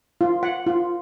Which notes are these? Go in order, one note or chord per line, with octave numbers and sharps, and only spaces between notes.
F4
F#5
F4